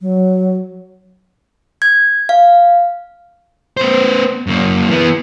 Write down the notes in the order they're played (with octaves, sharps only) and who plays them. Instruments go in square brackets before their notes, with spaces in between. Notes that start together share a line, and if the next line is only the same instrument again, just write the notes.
[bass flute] F#3
[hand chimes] G#6
F5
[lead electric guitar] B3 C5
F#2 A#3
E3 B3